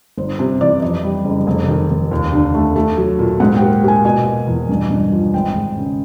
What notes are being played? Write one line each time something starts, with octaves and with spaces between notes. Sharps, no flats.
G1 C5
C3 C5
E3 D5
F2 D#5
G3
F#1
F1
D#3
F1
D#2
D3
A3
A3
F#3
A#2
G#2 F#5
G5
A#3
A#3 G#5
B2 G#5
B2
E2
G2
G2
F3
G#1 G5
G#1
C#3